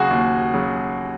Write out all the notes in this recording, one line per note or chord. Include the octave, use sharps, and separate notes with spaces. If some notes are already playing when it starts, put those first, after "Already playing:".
Already playing: D#2 C#3 F#3 F#4 G#4
D#2
C#3 F#3